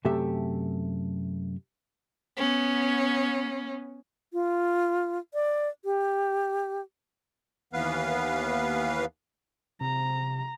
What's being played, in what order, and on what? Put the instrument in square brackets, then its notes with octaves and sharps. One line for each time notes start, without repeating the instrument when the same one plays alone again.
[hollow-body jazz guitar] F#2 C3 A3 G4 A4 E5
[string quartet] B3 C#4
[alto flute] F4
D5
G4
[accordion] D#2 E3 B3 B4 F5
[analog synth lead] C3 [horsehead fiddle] A#5